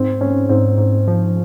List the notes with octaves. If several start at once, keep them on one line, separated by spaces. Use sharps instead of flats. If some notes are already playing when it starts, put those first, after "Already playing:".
Already playing: G#2 C4
G#2 C#4
G#2 C4
G#2
F3